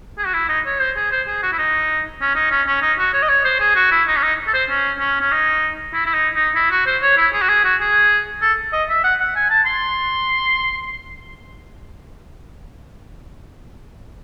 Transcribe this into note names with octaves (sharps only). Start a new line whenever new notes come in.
G#4
F#4
E4
D#4
C#5
C5
G#4
C5
G#4
F#4
E4
D#4
C#4
D#4
C#4
C#4
D#4
F#4
C#5
D#5
C#5
C5
G#4
F#4
E4
D#4
C#4
D#4
A4
C5
C#4
C#4
C#4
D#4
E4
E4
D#4
D#4
E4
F#4
C5
C#5
E4
G#4
F#4
G#4
F#4
G#4
A4
D#5
E5
F#5
F#5
G#5
A5
C6